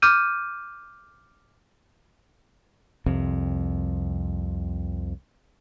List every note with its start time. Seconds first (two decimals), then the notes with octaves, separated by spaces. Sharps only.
0.02 D6 F6 G6 D#7
3.06 C2 F2 C3